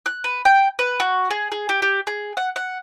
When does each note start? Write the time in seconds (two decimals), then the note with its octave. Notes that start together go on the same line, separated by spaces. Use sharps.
0.06 F#6
0.24 B4
0.45 G5
0.79 B4
1.00 F#4
1.30 G#4
1.52 G#4
1.69 G4
1.82 G4
2.07 G#4
2.37 F#5
2.56 F#5